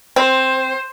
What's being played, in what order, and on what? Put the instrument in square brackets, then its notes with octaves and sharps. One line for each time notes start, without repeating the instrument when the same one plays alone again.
[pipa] C4 [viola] C5